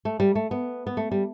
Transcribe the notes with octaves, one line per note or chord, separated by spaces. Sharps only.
A3
G3
A3
B3
B3
A3
G3